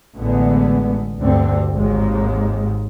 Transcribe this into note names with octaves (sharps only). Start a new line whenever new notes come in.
A1 D3 G#3 B3
D2 G2 D3 C4
G#1 D#2 G#2 G#3